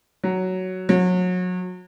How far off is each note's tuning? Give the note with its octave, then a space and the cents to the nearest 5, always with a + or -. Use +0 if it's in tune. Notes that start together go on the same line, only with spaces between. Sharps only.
F#3 +5
F#3 -30